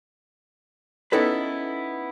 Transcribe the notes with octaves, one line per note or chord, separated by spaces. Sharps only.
B3 C#4 D#4 E4 A4 B4